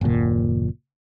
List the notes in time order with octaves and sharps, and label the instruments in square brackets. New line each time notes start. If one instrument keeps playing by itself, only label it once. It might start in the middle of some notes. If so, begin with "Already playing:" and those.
[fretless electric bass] F#1 D#2 A#2